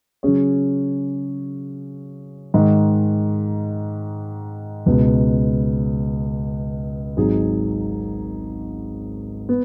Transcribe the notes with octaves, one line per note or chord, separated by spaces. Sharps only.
C#3 F#3 C#4 G#4 C#5
G#2 D#3 G#3
C#2 B2 B3
G#1 G#2 F#3 D#4 G#4
B3